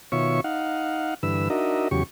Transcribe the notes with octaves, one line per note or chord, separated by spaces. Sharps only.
B2 D#3 F4 C#5 E5 C#6
D#4 F5 F#5
G2 D3 E3 B4 E6
D4 D#4 F#4 A#4 D#5 E5
E2 C#3 F#3 G4 C#6